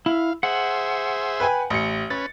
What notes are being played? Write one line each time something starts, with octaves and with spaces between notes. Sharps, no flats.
E4 F5
G#4 C5 E5 F#5
B4 G5 G#5
A1 C#7
C#4 B4 A6